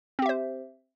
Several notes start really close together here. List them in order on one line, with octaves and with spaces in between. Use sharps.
C4 G4 E5 C5